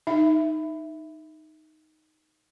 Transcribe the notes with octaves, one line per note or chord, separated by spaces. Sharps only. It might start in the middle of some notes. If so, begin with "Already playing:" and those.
D#4 E5